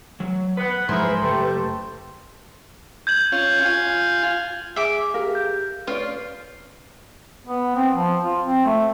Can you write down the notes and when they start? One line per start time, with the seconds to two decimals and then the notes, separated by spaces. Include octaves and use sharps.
0.20 F#3
0.57 B3 B4 F#5
0.89 G#2 F3 F#3 E4 G#4 A#4 C5
1.22 F#1 A3 G4 A4
3.07 G6 G#6 F#7
3.32 C#4 F4
3.65 F4 G#5
4.76 G#4 E5 D6
5.14 G4 G#4 A#4 F5
5.35 G6
5.87 C#4 F4 B4 D5 F6
7.47 B3
7.76 C4
7.94 F3
8.24 F4
8.46 C4
8.65 A3